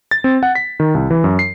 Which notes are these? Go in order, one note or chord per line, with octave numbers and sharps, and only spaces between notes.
A6
C4
F#5
B6
D#3
C2
E3
F#2
C7